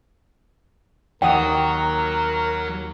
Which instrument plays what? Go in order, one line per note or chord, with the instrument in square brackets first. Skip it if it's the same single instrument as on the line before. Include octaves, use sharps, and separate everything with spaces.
[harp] D#2 D#6 [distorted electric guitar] F#3 F#4 [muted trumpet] A#4 [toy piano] D#5 F#5 G5